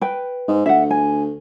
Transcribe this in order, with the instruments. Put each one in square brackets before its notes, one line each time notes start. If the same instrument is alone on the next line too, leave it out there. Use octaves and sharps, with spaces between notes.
[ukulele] B4 G5
[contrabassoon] G#2
[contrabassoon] D2 [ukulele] E5 F#5
[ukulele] G#5